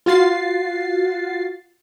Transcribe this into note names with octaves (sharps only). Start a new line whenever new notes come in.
F4 F#4 A6 C7